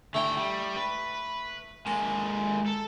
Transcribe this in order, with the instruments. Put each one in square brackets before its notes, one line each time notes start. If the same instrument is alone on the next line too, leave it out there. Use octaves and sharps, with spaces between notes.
[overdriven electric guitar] D3 G5 [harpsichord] A3 E4
[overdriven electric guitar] G3
B4
[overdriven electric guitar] G#3 A#3 [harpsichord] A5
[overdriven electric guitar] A4